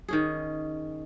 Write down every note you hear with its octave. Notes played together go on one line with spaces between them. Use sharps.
D#3 C#4 G#4